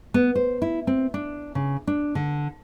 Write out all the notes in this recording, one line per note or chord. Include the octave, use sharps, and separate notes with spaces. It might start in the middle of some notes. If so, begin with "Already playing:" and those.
B3
C5
E4
C4
D4
C#3
D4
D3